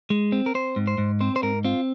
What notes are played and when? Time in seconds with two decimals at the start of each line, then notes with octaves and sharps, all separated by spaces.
0.10 G#3
0.32 C4
0.46 A#4
0.55 C4 C5
0.76 G#2
0.87 C5
0.98 G#2
1.21 C4 C5
1.36 C5
1.43 G#2 A#4
1.65 C4 F4